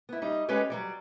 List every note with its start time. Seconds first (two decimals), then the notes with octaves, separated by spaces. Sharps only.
0.09 B3 E4
0.22 G3 D#4
0.48 G#3 C#4 G4 A4 B4 C#5
0.70 F#3 G3 D5